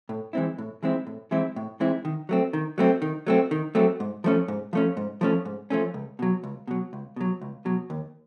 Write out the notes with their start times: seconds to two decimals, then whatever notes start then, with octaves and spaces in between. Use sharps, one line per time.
0.09 A2
0.33 E3 G#3 C4 E4
0.58 A2
0.83 E3 G#3 C4 E4
1.07 A2
1.31 E3 G#3 C4 E4
1.56 A2
1.80 E3 G#3 C4 E4
2.05 D#3
2.29 F#3 A3 C4
2.53 D#3
2.78 F#3 A3 C4
3.02 D#3
3.27 F#3 A3 C4
3.51 D#3
3.75 F#3 A3 C4
4.00 G#2
4.24 F3 A3 C#4
4.48 G#2
4.73 F3 A3 C#4
4.97 G#2
5.21 F3 A3 C#4
5.45 G#2
5.70 F3 A3 C#4
5.94 C#2
6.19 B2 F#3
6.43 C#2
6.68 B2 F#3
6.93 C#2
7.16 B2 F#3
7.41 C#2
7.65 B2 F#3
7.90 D#2